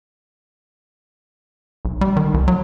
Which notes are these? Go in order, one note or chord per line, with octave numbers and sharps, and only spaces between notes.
B1
G3
D#3
C2
F#3